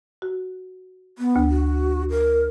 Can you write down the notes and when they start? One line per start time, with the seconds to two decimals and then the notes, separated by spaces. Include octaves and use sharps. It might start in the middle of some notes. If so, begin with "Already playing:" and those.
0.22 F#4
1.18 B3
1.36 D2
1.50 F#4
2.10 A#4